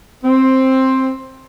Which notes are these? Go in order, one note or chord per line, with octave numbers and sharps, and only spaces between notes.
C4